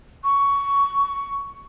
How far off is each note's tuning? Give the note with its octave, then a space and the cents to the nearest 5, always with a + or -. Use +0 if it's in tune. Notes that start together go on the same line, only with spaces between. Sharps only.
C#6 +15